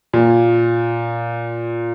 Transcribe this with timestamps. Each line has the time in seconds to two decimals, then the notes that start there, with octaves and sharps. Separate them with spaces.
0.13 A#2